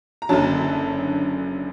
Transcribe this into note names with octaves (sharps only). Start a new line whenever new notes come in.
A#5
F#1 F#2 D3 F#3 A5